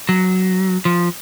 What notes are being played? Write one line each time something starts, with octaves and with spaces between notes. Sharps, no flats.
F#3
F3